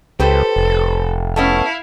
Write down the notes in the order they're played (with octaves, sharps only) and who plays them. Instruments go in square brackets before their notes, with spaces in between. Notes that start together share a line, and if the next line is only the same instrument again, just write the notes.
[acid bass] C#2 [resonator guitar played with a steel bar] G4 B4 C5 [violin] A4
[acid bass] F1
[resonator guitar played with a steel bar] A3 B3 C#4 [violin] E4 F5